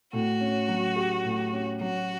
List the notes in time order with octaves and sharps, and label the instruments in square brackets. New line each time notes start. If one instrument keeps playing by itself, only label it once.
[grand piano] A2 [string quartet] F#4
[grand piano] C#4
F#3
G4
A2
C#4
[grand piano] F#3 [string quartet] F#4